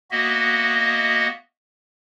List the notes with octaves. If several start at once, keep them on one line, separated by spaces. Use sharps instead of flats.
A#3 B3 F#4 D#5 E5